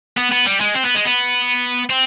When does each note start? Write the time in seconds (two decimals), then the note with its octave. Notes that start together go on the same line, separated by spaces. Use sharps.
0.17 B3
0.32 B3
0.46 G3
0.61 G#3
0.75 C4
0.85 B3
0.95 G#3
1.05 B3
1.90 C4